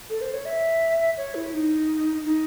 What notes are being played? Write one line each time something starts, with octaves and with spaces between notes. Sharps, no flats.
A4
C5
C#5
E5
C#5
E4
D#4
D#4